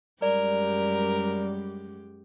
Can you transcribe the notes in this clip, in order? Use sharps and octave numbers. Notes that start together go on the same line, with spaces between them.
F#2 G3 G#3 G4 A#4 D5